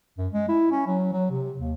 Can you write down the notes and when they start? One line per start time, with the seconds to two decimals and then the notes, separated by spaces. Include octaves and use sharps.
0.18 F#2
0.33 G#3
0.49 E4
0.71 C#4
0.87 F#3
1.13 F#3
1.30 C3
1.59 D#2